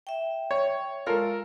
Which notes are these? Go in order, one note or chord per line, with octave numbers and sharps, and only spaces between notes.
E5 G5
C#5
G#3 F4 A4 A#4 F5